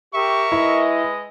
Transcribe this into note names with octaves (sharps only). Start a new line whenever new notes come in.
G4 A#4 E5 C#6
G#3 E4 B4 D#5